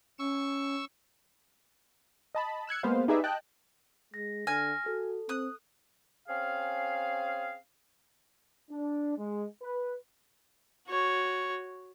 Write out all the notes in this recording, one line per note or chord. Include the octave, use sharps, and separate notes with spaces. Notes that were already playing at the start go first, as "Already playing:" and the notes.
C#4 C#6 E6
D#5 A5 B5
E6 F#6 G#6 C#7
G#3 A#3 B3 B4 C5 F5
D#4 G4 G#4 B4 D5 E5
D#5 G5 A5 F#6
G#3 A#6
D3 G#5 F6 A#6
F#4 A4
C4 D#6 F#6
C4 C#4 G#4 F5
D4
G#3
B4
F#4 C#5